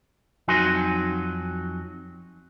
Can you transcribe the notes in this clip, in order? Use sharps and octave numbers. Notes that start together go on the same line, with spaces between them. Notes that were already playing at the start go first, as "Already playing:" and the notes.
F2 F#3 D#4 F#4 G#5 C6